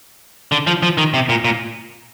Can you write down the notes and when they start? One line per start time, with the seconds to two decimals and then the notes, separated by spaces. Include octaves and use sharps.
0.52 D3
0.67 F3
0.83 F3
0.98 D#3
1.14 C3
1.29 A#2
1.45 A#2